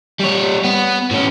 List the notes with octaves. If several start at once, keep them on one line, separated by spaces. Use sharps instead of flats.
G3 C#5
B3
A2 C#4